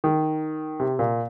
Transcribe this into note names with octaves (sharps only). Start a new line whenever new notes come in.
D#3
C3
A#2